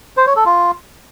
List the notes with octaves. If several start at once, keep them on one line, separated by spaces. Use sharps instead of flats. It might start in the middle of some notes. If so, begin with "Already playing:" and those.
C5
C#5
A4
F4